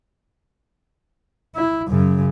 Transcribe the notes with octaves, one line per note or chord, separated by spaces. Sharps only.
E4
F#2 C#3